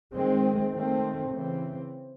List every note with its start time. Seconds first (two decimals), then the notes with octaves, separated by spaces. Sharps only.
0.12 D#3 G#3 C4
0.72 D#3 A3 C4
1.30 C#3 E3 C4